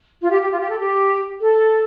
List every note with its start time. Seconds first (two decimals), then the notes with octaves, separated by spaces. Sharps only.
0.21 F4
0.31 G4
0.41 G4
0.50 F4
0.60 G4
0.69 A4
0.79 G4
1.40 A4